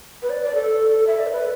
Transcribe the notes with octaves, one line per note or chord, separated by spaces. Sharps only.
B4
D5
D5
A4
E5
D5
A4
B4